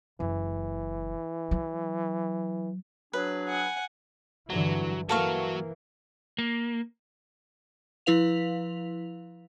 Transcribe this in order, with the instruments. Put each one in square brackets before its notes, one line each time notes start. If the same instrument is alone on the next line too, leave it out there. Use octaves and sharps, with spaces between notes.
[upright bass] F#1 [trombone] E3
[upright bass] F#3
[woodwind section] F#3 D4 G#4 [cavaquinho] B4
[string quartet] F#5 G#5
[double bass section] G2 D3 E3 [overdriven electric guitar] F#3
[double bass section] E3 A#3 [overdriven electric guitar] F#3 [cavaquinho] A4 F5 C#6
[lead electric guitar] A#3
[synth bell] F3 E4 B4 F5 F7